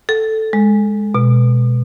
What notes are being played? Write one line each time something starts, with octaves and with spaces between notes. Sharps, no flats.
A4
G#3
B2